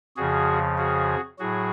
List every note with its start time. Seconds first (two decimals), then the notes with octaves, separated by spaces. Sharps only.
0.17 F2 C#3 F3 F#4 G#4
0.78 F#4 G#4
1.39 A2 F#3 F#4 G#4